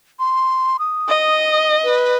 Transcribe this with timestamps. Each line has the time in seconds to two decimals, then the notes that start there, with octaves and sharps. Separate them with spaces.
0.19 C6
0.79 D#6
1.08 D#5
1.84 B4